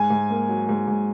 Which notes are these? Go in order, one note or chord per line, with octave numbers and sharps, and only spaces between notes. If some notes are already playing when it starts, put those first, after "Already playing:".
Already playing: G#2 G#5
G#2
A#3
F#3
G#2
G#2